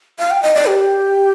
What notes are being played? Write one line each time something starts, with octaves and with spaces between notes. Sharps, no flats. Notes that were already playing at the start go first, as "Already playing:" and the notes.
F5
G5
D#5
D5
G4